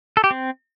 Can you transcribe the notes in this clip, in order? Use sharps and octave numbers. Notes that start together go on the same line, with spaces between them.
A4
G4
C4